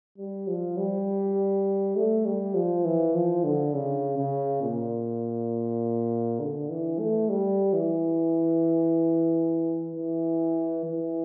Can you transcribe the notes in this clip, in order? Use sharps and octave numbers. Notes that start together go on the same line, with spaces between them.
G3
F3
G3
A3
G3
F3
E3
F3
D3
C#3
C#3
A#2
D3
E3
A3
G3
E3
E3
E3